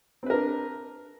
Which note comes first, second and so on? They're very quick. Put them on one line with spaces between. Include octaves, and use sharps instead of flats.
C4 B4 A#4 D4